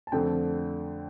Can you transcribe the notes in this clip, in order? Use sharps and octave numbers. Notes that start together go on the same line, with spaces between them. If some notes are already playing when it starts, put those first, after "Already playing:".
A5
F2 D3 A3 C4 G5